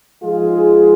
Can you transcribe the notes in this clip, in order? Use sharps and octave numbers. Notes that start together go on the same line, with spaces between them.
G#2 F3 G#3 F4 G#4